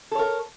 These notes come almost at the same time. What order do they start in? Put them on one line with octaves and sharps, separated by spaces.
A4 C#5 A#4